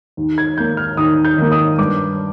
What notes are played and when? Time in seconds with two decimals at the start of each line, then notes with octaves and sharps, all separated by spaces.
0.17 D#2
0.38 G#6
0.57 D#3 A#3 G6
0.77 F6
0.97 D#2 D#6
1.25 G6
1.38 D#3 A#3
1.52 D#6
1.78 G2 D6